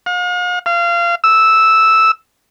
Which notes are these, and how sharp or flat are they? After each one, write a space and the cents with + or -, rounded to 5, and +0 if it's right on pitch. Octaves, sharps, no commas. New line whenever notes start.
F5 +45
F5 -25
E6 -5